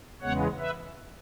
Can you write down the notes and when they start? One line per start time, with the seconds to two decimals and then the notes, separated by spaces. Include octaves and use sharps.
0.21 E2 C#3 G#3 B3 C#5 F#5
0.59 B4 E5